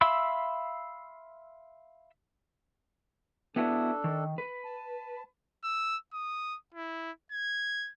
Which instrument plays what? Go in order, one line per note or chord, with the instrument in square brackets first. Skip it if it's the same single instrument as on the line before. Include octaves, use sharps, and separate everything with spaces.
[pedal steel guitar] E5 F5 B5 C6 E6
[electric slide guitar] B3 E4 F#4 [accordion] D4 A4
[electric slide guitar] D#3
B4
[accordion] A5
[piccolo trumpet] E6
D#6
E4
G#6